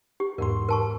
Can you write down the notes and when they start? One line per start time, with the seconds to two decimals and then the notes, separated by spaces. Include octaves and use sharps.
0.20 G4
0.38 E2 G#2 A#4 C6
0.69 A#4 A5 C#6